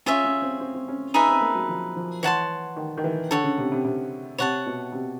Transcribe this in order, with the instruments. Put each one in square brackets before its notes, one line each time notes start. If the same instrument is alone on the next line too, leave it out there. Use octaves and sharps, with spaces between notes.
[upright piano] C#4 [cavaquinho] F4 G#4 C#5 E5
[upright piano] C#4
C4
C4
C4
C#4
[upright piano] C#4 [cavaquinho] D#4 G#4 B4 E5
[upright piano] C4
A#3
F#3
F3
F3
[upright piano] E3 [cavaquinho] C#5 F#5 A5 C6
[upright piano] D#3
D#3
E3
[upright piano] D3 [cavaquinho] A4 C#5 F#5
[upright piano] C#3
C3
C3
C3
[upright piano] C3 [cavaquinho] C#5 F#5 A5
[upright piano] B2
C3